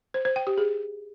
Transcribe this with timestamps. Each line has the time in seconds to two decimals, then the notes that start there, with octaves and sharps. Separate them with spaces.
0.14 C5
0.25 C5
0.36 G5
0.47 G4
0.58 G#4